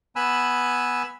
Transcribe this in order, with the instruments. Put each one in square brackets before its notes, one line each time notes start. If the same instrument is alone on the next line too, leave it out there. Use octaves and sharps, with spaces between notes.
[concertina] B3 G#5 B5 E6 F#6